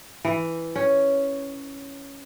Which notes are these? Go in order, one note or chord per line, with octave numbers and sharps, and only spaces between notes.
E3
C#4